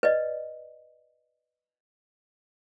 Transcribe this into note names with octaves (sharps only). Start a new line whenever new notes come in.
B4 D5 D#5